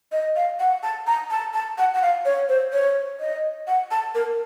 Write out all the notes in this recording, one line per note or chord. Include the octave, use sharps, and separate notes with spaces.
D#5
F5
F#5
A5
A#5
A5
A5
F#5
F#5
F5
C#5
C5
C#5
D#5
F#5
A5
A#4